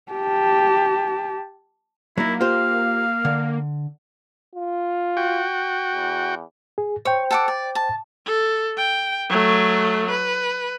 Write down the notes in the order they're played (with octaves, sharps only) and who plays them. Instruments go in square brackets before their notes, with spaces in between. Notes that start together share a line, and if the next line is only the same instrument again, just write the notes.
[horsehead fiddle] G4 A5
[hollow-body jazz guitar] F#3 D#4 [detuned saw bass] A#3 [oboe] E4
[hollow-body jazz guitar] F4 G4 C5 [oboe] F5
[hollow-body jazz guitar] D3
[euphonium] F4
[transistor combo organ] F#4 G5
[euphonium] E2
[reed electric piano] G#4
[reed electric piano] C5 G5 [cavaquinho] C#5
[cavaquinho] A4 F#5 D6
D5
A5
[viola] A4
G5
F#3 A3
B4